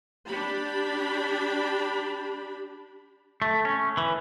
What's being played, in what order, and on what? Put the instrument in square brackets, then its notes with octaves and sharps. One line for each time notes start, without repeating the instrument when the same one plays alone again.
[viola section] D4 G4 B5
[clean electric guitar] A3
C#4
E3